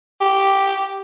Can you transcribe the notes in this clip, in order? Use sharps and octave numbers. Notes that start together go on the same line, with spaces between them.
G4